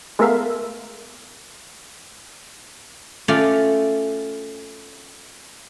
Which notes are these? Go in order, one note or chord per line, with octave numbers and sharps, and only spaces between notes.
G#3 A3 B3 A#4 E5 F5
A3 C#4 F4 D5